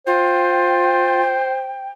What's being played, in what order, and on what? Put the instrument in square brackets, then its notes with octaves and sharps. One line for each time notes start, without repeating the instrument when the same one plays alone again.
[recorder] F4 [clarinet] C5 [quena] G5